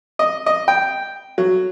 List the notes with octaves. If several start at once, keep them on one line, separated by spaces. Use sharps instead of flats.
D#5
D#5
G5
F#3